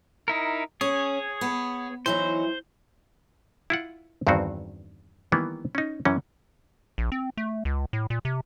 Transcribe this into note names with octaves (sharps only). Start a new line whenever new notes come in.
D#4 E4 A#4
C#4 G#4 C#5
B3
E3 F#3 D#4 C5
E4 F4 F#5
E2 G2 D3 D#3 C4 F#4
D#3 E3 G3 A#3 B3
C#4 D#4
F#2 E3 C#4
A#1
C4
A3
C#2
A2
A#2
C3